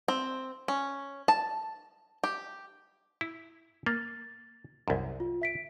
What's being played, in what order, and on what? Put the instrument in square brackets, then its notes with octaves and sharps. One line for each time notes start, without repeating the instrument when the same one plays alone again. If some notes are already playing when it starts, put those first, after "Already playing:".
[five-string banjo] C4
C#4
A5
G4
[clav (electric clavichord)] E4
[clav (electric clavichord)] A#3 [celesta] A6
[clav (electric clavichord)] C2 F#2
[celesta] F4
E5 B6 D7